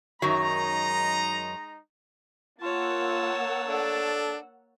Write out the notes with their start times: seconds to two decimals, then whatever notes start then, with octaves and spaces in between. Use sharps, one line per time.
0.22 F#2 D#3 F#3 G#3 D#4 A#5
2.62 A#3 F4 C#5 F#5 A5 E6
3.67 D4 A4